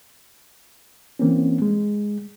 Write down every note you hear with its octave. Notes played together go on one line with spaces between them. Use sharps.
E3 A#3 C4 C#4
G#3